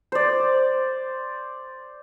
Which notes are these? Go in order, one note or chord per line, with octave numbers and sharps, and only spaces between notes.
C5 D5